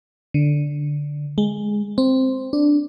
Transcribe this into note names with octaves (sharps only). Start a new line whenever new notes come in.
D3
G#3
C4
D4